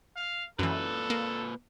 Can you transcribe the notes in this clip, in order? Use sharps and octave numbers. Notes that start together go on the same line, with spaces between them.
F5
F#2 A#2 E3 A4 B4
A#3